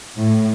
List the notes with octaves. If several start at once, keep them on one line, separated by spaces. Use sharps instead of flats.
A2